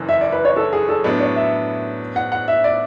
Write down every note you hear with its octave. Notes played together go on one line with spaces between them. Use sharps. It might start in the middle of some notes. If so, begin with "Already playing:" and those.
Already playing: F#1 F#2 E3
E5
D5
B4
C#5
A4
G#4
A4
A2 F#3 B3 D4 B4
C#5
E5
F#5
F#5
E5
D5